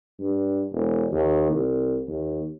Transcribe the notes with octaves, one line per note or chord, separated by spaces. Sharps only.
G2
E1
D#2
C2
D#2